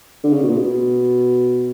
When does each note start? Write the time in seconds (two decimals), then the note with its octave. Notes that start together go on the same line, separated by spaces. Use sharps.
0.23 D3
0.32 C#3
0.43 B2
0.49 A#2
0.58 B2